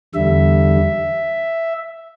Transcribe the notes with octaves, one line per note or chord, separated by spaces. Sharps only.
E2 D3 G3 E5